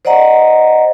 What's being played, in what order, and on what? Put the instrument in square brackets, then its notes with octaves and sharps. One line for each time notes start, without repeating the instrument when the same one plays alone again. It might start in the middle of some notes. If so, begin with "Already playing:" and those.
[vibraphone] C5 D5 D#5 F#5 A#5